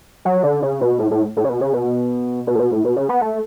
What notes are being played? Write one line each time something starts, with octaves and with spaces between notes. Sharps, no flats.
F#3
D3
C#3
B2
A2
A2
A2
C#3
B2
C#3
B2
B2
A2
B2
A2
B2
C#3
B3
A3